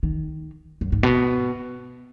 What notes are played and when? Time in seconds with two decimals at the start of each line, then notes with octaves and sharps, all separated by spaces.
0.03 D#3
0.81 F#2
0.92 G#2
1.03 B2